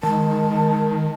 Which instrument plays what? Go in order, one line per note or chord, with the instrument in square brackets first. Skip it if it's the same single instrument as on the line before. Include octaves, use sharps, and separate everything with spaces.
[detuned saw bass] D#3 [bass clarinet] G#3 [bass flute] A#4 [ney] A5